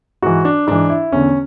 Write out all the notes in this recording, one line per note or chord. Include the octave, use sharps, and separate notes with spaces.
G#2 E3 F#4
D4
G#2 E3 D4
E4
E2 D3 C#4